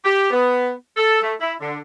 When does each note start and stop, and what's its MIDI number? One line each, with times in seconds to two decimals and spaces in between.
0.04 0.30 67
0.31 0.71 59
0.97 1.20 69
1.21 1.33 57
1.40 1.54 64
1.60 1.78 50